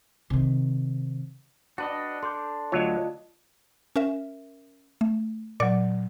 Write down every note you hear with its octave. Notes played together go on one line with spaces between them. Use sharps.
C3 D#3
D4 F#4 B4 D#5
A4 C6 D6 G6
D2 F#3 F4 C#5 D#5
C#4 A#4 E5
A3
A#2 F#3 D5